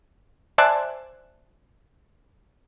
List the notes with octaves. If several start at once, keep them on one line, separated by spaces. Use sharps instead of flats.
C5 D5 E5 G#5 A5 F#6